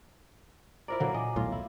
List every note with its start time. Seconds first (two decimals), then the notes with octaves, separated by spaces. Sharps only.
0.88 E4 F4 A#4 C5 D5 A#5
1.00 A#2 D3 E3 F#3 A#3 F#5 A#5
1.14 A#2 D#5 G#5 D6
1.36 D#1 B1 A2 F4
1.52 E4